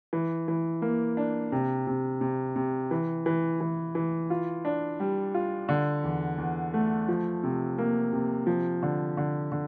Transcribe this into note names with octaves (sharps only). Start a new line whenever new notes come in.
E3
E3
A#3
D4
C3
C3
C3
C3
E3
E3
E3
E3
F4
D4
G3
F4
D3
E2
E2
A3
F3
C3
A#3
C3
F3
D3
D3
D3